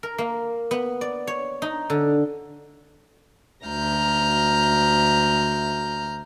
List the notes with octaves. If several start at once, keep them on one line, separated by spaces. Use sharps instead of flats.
A#4
A#3
B3
D5
C#5
D#4
D3
D2 A#5 F6 G6